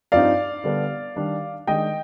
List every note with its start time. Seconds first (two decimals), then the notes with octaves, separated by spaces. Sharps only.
0.12 G2 F3 C4 D#4 D5 F5
0.64 D3 G3 B3 D4
1.16 D#3 G3 D4
1.67 D#3 G#3 D4 D#5 G5